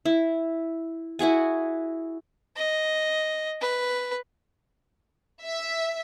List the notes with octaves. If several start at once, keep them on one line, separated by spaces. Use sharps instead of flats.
E4
E4 F#4 G#4 G#5
D#5
B4
E5